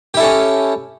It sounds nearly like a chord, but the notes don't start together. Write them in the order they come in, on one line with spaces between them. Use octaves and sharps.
G4 E4 A4 C#4